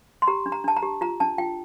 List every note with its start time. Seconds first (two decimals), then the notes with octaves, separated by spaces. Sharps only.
0.22 C6
0.27 G4 A#5
0.46 D4
0.52 A#5
0.64 D4 A5
0.77 A#5
0.83 G4
1.01 F4 A#5
1.20 D4 A5
1.38 F4 G5